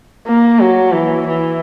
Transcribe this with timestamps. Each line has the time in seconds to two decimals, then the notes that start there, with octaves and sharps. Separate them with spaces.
0.27 A#3
0.60 F#3
0.94 E3
1.27 E3